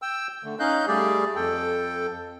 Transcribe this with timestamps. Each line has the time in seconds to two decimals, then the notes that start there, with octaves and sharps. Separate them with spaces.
0.02 G5 E6
0.44 D3 A3
0.59 C#4 D#4 D#5 F5 F#6 G6
0.88 G3 A3 G4 G#4 D5
1.35 F2 A4 G5